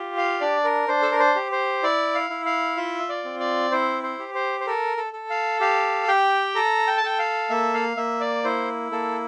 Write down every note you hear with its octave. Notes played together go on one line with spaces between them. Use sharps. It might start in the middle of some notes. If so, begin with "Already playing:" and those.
Already playing: F4 G4
F5
D4 D5
A#4
D4 C5
A4
A#4
C5
G4
C5
E4 D5
F5
E4
F5
F4 E5
D5
C4
D5
E4 C5
C5
G4
C5
C5
A4 A#4
A4
A4
F5
G4 F5
G4 G5
A4 A#5
G5
A5
A4 G5
F5
A#3 E5
F5
A#3 E5
D5
E4 C5
A#3 A4